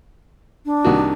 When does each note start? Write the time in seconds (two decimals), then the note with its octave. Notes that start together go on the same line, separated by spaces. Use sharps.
0.65 D4
0.84 C2 D#3 F#4